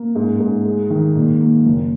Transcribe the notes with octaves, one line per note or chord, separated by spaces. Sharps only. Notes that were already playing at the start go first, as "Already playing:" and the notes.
Already playing: A#3
G#2
G#2
G#3
D#3
A#2
A#3
F#1